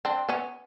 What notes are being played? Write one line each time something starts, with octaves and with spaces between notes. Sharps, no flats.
C4 D4
B3 C#4